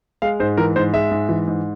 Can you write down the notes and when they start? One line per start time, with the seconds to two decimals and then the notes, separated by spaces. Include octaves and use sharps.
0.22 G#3 F5
0.40 G#2 C5
0.57 E3 A#4
0.76 G#2 C5
0.94 G#3 E5
1.11 G#2
1.29 E3
1.48 G#2